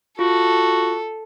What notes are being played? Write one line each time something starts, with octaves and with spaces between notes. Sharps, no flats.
F4 F#4 A4